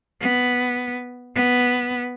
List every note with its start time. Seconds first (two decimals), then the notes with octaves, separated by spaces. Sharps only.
0.21 B3
1.35 B3